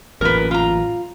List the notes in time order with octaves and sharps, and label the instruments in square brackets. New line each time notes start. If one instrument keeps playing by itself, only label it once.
[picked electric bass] A1 F#2 A#2 [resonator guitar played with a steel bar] A#4 B4
[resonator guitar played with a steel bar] F4 A#5